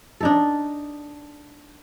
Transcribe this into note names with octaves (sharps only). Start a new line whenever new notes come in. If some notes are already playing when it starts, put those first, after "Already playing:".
D4 D#4 A4